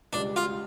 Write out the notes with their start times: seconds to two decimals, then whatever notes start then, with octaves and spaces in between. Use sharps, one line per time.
0.13 C#2 C#3 G3 D4
0.36 F4